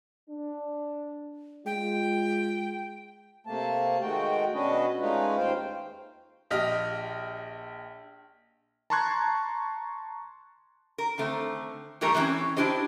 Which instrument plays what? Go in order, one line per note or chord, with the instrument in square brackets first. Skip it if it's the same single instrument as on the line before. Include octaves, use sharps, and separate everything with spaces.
[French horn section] D4
[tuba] G#3 [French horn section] F4 [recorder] G5
[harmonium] C3 A3 A#3 A5
D#3 G#3 A3 F#4 G5
B2 C#4 D4 F#4 B4 D#5
G#3 A3 C#4 D#4 F4 B4
D#2 C5 F5 G5
[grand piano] A#1 G4 D#5 F6
[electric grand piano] A5 A#5 C6 C#6 F#6 G#6
[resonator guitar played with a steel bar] A#4
D3 D#3 A3 C4
E3 G3 A3 G4 A#4
E3 G#3 A#3 C4 C#4
D4 E4 G4 C5 D#5